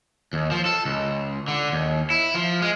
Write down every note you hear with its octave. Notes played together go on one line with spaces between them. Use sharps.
D#2
F3
A4
C#2
D3
D#2
E4
F3
G#3